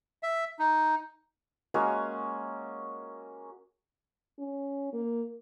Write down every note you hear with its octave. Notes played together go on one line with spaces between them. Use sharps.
E5
D#4
G#3 A#3 C#4 F#4
C#4
A#3